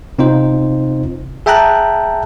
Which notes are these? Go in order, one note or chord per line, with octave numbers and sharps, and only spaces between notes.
C3 C4 D#4 F4 C5
G#4 E5 G5 A5 A#5 F#6